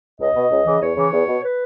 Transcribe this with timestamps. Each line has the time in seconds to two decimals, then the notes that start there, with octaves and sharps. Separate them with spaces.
0.19 C#2 D#5
0.35 B2
0.51 C#2
0.66 C#3 E3
0.81 E2 C#5
0.97 C#3 E3
1.12 E2
1.27 B2
1.43 B4